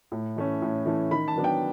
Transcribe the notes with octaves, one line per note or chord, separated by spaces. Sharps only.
A2
E3 A3 C#4
A2
E3 A3 C#4
D#3 B5
A5
F#3 B3 D4
G5